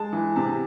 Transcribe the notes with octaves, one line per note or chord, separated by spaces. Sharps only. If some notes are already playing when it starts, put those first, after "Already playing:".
Already playing: G#3 A5
E3
C3 A5